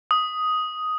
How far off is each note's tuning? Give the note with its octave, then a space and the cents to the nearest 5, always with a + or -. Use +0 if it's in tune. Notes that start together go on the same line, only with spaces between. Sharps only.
D#6 +5